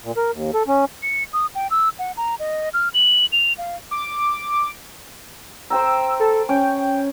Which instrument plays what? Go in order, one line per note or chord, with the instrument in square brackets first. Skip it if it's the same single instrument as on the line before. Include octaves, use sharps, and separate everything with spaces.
[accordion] A#2
A#4
D#2
A4
C#4
[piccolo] C#7
D#6
G5
E6
F#5
A#5
D#5
F6
F#7
F7
F5
[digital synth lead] D6
[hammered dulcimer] C5 G5 A#5 [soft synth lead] E6
[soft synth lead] A4
[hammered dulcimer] C#4 [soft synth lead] G5